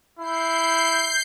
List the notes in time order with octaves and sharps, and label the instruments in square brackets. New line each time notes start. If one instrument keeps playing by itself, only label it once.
[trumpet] E4 [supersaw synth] G6 C7